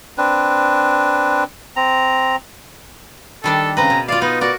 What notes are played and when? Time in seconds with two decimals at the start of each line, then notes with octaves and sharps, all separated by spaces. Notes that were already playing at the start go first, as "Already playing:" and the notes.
0.18 C4 D4 B4
1.76 C4 A#5
3.44 D#3 G3 D4 A4
3.77 C#3 C4 B4 A#5
3.90 B2
4.08 F4 D5 F5
4.22 B3 D#4
4.41 F#4 A#4 D5